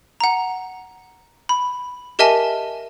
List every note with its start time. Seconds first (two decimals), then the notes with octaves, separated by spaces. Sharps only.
0.20 F#5 A#5
1.49 B5
2.19 G4 A#4 D#5 E5 G#5 A5